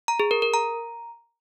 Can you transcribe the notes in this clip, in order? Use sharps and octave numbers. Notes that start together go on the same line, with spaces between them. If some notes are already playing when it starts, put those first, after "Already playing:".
A#5
G#4
A#4
A#4
A#5